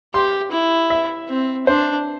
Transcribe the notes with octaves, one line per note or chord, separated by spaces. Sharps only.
G4 C6
E4
E5
C4
D4 C5